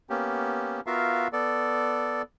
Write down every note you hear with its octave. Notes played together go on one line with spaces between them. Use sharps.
A#3 B3 C#4 G4
B3 F4 F#4 A#4 E5 F5
B3 A4 D5